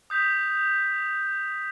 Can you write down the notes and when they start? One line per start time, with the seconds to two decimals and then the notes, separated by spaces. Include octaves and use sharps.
0.10 D#6 G6 B6 F7